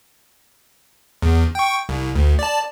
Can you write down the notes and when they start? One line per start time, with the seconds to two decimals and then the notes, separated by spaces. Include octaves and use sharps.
1.22 E2
1.55 G5 C#6
1.89 C2
2.15 D2
2.39 D5 A5